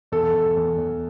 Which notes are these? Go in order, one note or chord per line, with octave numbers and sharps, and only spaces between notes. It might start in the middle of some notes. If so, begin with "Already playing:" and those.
E2 A4
E2
E2
E2